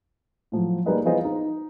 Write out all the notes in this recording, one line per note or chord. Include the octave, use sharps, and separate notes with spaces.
A2 F3 F#3
G3 A#3 D#4 G#4 B4 D#5
E3 B3 F4 G#4 C5 D#5
D#4